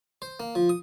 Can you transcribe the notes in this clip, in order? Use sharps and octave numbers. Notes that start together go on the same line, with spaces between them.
C5
A#3
F3
D#6